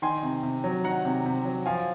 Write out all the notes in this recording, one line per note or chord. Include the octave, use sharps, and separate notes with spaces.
D#3 G#5 C6
C3
C3
F#3
D#3 F#5 A#5
C3
C3
F#3
F3 F5 G#5